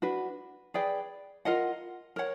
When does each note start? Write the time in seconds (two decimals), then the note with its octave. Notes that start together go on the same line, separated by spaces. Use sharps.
0.02 D4 F#4 B4
0.74 G#4 B4 D5 G5
1.45 F4 A#4 D#5 F#5
2.16 A#4 C#5 F#5